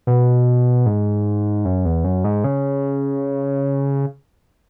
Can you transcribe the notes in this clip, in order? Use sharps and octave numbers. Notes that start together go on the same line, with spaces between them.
B2
G#2
F#2
E2
F#2
G#2
C#3